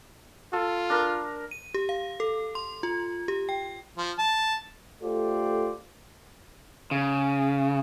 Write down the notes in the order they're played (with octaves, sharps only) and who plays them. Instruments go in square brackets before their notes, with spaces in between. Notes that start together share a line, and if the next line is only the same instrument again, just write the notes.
[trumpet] F4 [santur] A4
[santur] D4 A#4
[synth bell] D#7
G4
F5
A4
C6
F4
G4
G5
[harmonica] F3
A5
[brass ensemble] A3 F4 G4 A4 C5 D5
[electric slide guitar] C#3